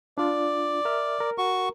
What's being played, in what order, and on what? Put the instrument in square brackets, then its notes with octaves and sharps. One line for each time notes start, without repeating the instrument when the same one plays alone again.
[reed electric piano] D4 F4 [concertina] D5
[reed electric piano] A#4 E5 F6
A#4
[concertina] F#4 C#6